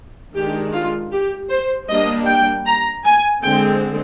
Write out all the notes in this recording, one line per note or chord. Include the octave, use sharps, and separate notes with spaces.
D#3 G#3 D4 G4
F4
G4
C5
G3 A#3 D4 D#5
G5
A#5
G#5
D3 G#3 C4 G5